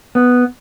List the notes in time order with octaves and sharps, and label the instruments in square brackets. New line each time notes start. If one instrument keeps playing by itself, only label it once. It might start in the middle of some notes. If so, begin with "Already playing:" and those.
[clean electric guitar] B3